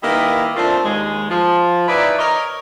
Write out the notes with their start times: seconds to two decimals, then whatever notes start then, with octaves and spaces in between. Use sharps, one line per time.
0.03 D#3 G3 A#3 E4 B4 D#5
0.56 F3 A3 A#3 C4 D4 F4
0.84 D#2 G#3
1.30 F3
1.88 D#4 E4 G#4 B4 D5
2.18 A#4 C#5 D#5